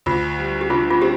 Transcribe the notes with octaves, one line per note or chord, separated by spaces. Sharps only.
D2 F4
G3
G4
D3 F4
F4
C4 G4